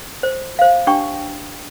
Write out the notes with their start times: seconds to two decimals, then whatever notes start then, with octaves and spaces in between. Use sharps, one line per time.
0.23 C5
0.59 C5 F5
0.87 D4 G4 G5 C#6